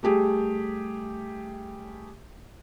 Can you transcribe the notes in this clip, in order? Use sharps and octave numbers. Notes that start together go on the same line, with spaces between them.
G3 A3 G4 G#4